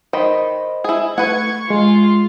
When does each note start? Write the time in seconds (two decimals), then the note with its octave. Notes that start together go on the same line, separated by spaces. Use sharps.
0.13 D#3 C5 D#5 B5
0.84 E4 G#4
1.18 A3 B4 F#5 C#6 G#6
1.70 G#3 F4